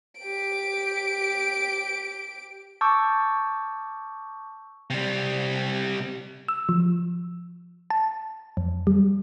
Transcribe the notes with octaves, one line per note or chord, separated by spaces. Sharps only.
G4 D7
A5 C#6 D6 E6 G6
C3 G3
E6
F3
A5
F2
G3